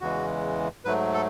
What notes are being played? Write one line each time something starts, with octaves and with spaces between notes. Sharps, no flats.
E2 C#3 E3 G#3 F#4
G#2 F#3 A3 B4
A4